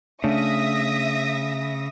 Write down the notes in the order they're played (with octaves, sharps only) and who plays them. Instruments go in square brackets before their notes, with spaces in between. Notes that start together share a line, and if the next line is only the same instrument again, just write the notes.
[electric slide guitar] C#3 [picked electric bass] A3 D4 [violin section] E5 D#6 A#6